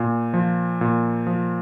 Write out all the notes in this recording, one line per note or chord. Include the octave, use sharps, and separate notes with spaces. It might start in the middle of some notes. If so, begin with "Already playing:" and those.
Already playing: A#2
F3
A#2
F3